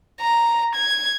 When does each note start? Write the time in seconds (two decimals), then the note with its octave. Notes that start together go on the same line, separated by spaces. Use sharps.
0.21 A#5
0.75 G#6